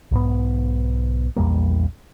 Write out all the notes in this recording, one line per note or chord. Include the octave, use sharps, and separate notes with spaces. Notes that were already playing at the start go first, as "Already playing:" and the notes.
B1 G#2 B3
A#1 E2 G3 A#3